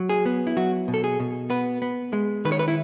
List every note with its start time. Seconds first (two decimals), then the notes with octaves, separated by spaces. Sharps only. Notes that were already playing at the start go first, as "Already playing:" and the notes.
Already playing: F#3
0.09 G#4
0.26 B3
0.47 E4
0.57 F#3 F#4
0.88 B2
0.94 A4
1.04 G#4
1.20 B2
1.50 B3 B4
1.82 B3
2.13 G#3
2.45 D#3 B4
2.52 C#5
2.59 B4
2.68 E4